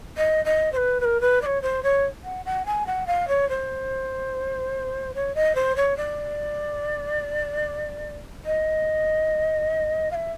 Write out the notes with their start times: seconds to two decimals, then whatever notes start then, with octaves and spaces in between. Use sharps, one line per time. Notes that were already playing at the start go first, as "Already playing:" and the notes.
0.17 D#5
0.45 D#5
0.72 C5
0.77 B4
1.00 B4
1.04 A#4
1.21 B4
1.42 D5
1.46 C#5
1.62 C5
1.83 C#5
2.24 F#5
2.45 F#5
2.66 G#5
2.86 F#5
3.07 F5
3.28 C#5
3.49 C5
5.14 C#5
5.35 D#5
5.55 C5
5.76 C#5
5.97 D5
8.45 D#5
10.11 F5
10.14 E5